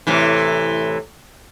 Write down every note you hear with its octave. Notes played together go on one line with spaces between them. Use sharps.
A2 C3 E3